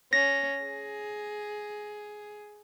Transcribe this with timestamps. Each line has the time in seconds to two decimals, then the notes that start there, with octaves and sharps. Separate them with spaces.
0.13 C#4 A#6
0.63 G#4